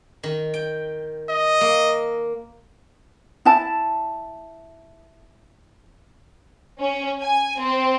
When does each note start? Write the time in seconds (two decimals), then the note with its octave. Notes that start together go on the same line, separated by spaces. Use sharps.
0.23 D#3
0.54 G5
1.29 D#5
1.61 A#3
3.45 E4 A5
6.79 C#4
7.20 G#5
7.59 C4